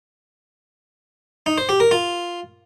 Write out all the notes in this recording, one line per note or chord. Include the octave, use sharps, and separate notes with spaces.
D#4
C5
G4
A#4
F4